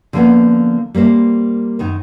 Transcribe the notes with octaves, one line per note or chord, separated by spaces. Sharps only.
D3 F3 G3 A#3 B3 C#4
G3 A#3 A#4 C5
F#2 D#3 D#4